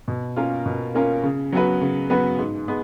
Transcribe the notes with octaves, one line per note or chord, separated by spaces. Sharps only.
B2
A#3 C#4 F4 A#4
B2
A#3 C#4 F4 A#4
C#3
F#3 B3 F#4 B4
C#3
F#3 B3 F#4 B4
G#2
G#3 B3